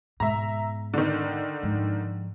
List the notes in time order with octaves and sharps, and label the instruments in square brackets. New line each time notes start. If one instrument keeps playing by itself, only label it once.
[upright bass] G#2 B2 [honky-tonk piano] E5 A#5
[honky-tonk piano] D3 D#3
[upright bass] G#2 F3